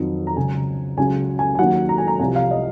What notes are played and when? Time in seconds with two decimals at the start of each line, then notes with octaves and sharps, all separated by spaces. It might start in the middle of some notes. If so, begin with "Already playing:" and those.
Already playing: F2 D#3 F#3
0.27 A#5
0.36 C#2 C#3 F#3 G#5
0.98 C#2 C#3 F#3 G#5
1.39 G#5
1.55 G#5
1.59 D#2 D#3 F#3 F#5
1.89 A#5
1.98 G#5
2.08 A#5
2.19 C2 C3 F3 G#5
2.36 F5
2.51 D#5